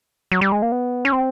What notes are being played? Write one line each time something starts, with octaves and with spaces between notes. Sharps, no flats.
F#3
G3
G#3
A#3
B3
C#4
C4